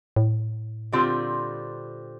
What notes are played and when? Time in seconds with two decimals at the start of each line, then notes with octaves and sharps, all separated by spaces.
0.16 A2
0.92 A#2 D3 G3 C4 F4